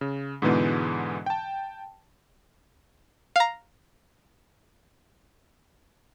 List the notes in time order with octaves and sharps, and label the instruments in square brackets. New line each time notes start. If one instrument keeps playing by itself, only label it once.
[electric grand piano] C#3
G#2 B2 D3 E3 G#3 B3
G5 A5
[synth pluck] F5 A#5